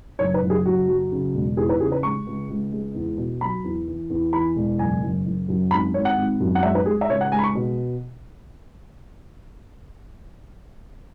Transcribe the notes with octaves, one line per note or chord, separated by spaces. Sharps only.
F#1 C#5
B4
F#1
G#4
F#1 F#4
F#3
C#3
E1
E2 G#4
B4
C#3 G#4
B4
G#3 C#6
C#2
C#2
G#3
E2
B2
F#3 B5
E2
E3
E2
E3 B5
E1
F#1 G#5
F#1
F#1
F#2
G#1 B5
G#1 C#5
F#5
G#1
F#2
F#5
G#3 E5
B4
G#3 G#4
E5
C#2 C#5
F#5
G#3 G#5
B5
C#6
B2